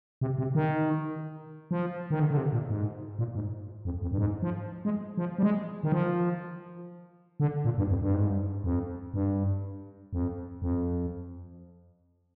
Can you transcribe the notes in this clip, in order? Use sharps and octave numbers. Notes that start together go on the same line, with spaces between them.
C3
C3
D#3
F3
D#3
D3
D3
C3
A#2
G#2
A#2
G#2
F2
F2
G2
G#2
F3
G#3
F3
G3
G#3
D#3
F3
D3
A#2
G2
F2
G2
G#2
G2
F2
G2
F2
F2